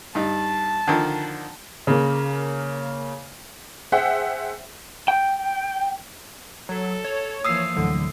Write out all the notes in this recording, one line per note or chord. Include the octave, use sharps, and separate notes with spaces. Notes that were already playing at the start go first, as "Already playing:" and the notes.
G2 D#4 A5
D3 D#3 F3
C#3 A#3
G#4 C5 E5 F#5 G5
G5
F#3 A4
C#5
E3 F3 A#3 D#6 E6 C7
D2 A2 D3 E3 F#3